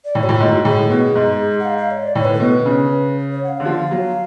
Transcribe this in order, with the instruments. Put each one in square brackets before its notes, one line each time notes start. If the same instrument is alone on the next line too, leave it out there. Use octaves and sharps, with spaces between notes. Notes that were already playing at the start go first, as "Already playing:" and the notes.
[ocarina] D5
[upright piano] A2 [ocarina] C#5
[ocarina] F#4
[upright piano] A2 [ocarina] F4
[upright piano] G#2
[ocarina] F#4
[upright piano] A2 [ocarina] G#4
[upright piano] B2
G#2
[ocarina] F#5
F5
F5
C#5
D5
[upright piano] A2 [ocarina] C#5
[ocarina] B4
A4
[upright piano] B2 [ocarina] B4
[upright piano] C#3
[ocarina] C#5
F#5
F5
[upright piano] D3
F3
F#3